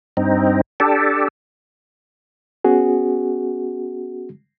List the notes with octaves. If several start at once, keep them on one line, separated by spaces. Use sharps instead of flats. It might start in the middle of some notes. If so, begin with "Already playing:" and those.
G2 C4 D#4
D4 G4 A4
B3 C#4 F#4 G#4